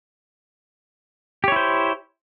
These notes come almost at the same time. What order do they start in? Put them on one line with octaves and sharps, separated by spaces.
G4 C#5 E4 C5